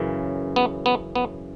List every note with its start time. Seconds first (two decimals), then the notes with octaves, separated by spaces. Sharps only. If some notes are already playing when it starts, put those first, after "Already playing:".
Already playing: F#2 C#3 E3
0.56 B3
0.86 B3
1.15 B3